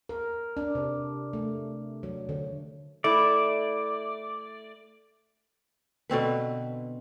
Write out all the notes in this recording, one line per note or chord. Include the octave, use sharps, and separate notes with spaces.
A#4
D4
C3
A3
F#3
D3
A3 E4 D5
B2 D3 C4 B4